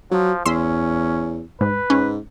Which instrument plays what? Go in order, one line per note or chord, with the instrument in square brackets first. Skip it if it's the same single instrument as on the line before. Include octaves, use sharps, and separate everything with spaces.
[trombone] F3 [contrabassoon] F#3
[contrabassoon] E2 [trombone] C#4 [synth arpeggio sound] C6 E6 B6
[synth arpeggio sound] G#2 [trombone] B4
[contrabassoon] G#2 [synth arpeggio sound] C#4